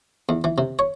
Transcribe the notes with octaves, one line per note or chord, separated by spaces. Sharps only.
E2
E3
C3
C#5